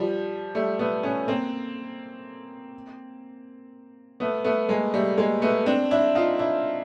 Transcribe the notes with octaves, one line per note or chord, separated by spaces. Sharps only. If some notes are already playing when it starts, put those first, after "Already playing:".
Already playing: F3 G3
G3 A3
A3 B3
B3 C#4
A#3 C4
A3 B3
A3 B3
G#3 A#3
G3 A3
G#3 A#3
A3 B3
C4 D4
D4 E4
D#4 F4
D4 E4